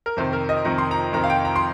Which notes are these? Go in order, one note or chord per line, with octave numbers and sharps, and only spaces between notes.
A#4
F2 C3 D#3 C5
A#4
D#5
F2 C3 D#3 A#5
C6
A#5
F2 C3 D#3 A#5
F5
G5
A#5
C6